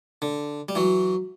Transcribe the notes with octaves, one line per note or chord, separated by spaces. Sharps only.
D3
G3
E3 F#3